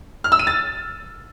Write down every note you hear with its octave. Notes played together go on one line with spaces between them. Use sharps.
F6
E6
D#7
A6